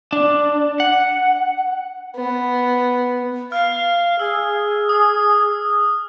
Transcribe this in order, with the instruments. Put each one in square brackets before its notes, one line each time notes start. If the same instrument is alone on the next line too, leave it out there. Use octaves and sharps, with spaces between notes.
[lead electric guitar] D4
F#5
[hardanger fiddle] B3
[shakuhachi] F5 [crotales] F6
[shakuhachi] G#4 [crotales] E6
[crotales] D#6